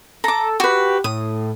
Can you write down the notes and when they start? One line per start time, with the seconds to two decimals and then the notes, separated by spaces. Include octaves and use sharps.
0.24 A4 A#5 D6
0.60 F#4 G4 B4
1.04 A2 D#6